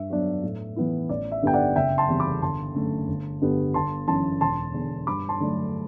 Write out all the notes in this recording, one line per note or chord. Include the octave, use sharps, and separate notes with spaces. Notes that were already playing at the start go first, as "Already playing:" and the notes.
Already playing: G2 E5
F#3 B3 D4
A2
E3 B3 E4
A1 D5
E5
G2 D3 G3 B3 G5
D5 F#5
F#1 E5 G5
A5 C6
E2 C3 G3 C4
B5 D6
G1 A5 C6
F#2 D3 A3
G1
G2 D3 G3 B3
G1 A5 C6
F#2 E3 A5 C6
E1 A5 C6
E2 D3
G2 B5 D6
A5 C6
D3 F#3 A3 D4